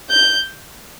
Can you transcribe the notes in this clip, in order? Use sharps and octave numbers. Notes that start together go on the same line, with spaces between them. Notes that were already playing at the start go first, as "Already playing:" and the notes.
G6